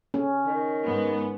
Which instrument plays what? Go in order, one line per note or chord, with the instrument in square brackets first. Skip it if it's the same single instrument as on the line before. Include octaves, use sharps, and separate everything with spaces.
[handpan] C#4
[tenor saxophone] D#3
[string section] G#2 B3